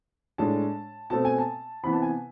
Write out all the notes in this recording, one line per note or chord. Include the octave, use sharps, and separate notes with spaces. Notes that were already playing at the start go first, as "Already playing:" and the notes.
A2 G#3 D4 A5
B2 A3 C4 A5
G#5
A5
C3 E3 B3 B5
A5
G#5